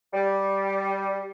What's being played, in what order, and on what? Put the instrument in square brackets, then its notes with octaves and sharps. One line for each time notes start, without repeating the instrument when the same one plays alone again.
[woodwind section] G3